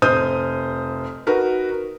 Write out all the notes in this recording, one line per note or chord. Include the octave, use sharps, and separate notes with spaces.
F1 C5 D#6 F6 G6 D#7
D#4 F#4 A#4 B4